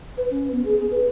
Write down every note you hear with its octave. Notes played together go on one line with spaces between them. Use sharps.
B4
C#4
B3
G#4
G#4
B4